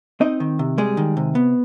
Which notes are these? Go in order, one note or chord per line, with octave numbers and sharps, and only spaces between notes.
C4 D#4 D#5
D#3
C3
G3 G#3 G#4
D#3
C3
B3